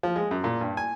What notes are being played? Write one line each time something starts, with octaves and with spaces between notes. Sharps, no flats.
F3
G#3
F#2
A#2
G2
G#5